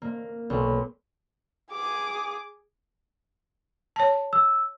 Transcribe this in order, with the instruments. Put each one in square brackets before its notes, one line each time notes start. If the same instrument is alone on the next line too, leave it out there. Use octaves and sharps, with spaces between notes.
[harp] A#3
B1
[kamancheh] G#4 D6
[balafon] C#5 A5
[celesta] E6